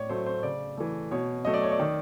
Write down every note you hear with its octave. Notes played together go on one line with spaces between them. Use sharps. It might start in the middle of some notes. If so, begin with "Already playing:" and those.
Already playing: A2 C#5 D5
F#3 A3 C5
C5
C#3 D5
E3 A3
B2 C#5
F#3 A3 D#5
D5
C#5
D5
D#3